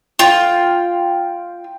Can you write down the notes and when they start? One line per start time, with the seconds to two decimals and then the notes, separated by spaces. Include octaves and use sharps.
0.19 F4 G5